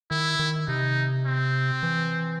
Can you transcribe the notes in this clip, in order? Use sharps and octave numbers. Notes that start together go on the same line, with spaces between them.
D#3 E4
D#3
C3 D#4
C4
E3